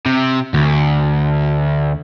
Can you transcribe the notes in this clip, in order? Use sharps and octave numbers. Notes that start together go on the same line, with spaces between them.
C3
D2